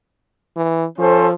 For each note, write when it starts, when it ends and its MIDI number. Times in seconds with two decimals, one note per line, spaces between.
0.56 0.85 52
0.98 1.33 53
0.98 1.26 61
0.98 1.26 69
0.98 1.26 72